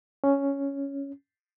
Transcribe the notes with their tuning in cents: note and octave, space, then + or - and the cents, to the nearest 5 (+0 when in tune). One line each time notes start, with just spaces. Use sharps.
C#4 +5